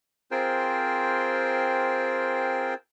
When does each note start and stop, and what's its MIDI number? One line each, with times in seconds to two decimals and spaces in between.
0.31 2.74 60
0.31 2.74 65
0.31 2.74 68
0.31 2.74 70
0.31 2.74 72
0.31 2.74 79